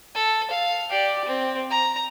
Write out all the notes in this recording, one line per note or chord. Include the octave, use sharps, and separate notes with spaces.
A4
F5
G4 D5
C4
A#5